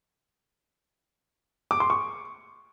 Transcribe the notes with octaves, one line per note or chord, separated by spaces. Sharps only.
D6
C6
C#6